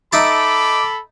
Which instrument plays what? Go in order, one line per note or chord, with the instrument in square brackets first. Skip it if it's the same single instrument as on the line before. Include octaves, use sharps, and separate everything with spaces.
[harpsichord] D#4 E5 A5 [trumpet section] A4 B5 [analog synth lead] D6